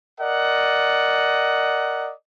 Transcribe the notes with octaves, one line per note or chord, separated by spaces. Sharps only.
A#4 D5 D#5 F#5